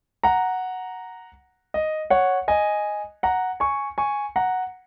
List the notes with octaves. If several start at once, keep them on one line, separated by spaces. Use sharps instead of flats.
F#5 A#5
D#5
C#5 F#5
D#5 G#5
F#5 A#5
G#5 C#6
G#5 C#6
F#5 A#5